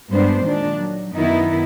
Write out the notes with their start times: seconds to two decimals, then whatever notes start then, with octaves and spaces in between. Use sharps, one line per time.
0.10 G2 G#3 B3 D4 C5
0.44 A#2 D#3 G#3 D4
0.76 F#3
1.15 F#2 D#3 B3 D#4 E4